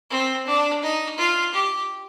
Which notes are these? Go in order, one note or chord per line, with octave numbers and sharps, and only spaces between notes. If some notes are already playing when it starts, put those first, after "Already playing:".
C4
D4
D#4
F4
G4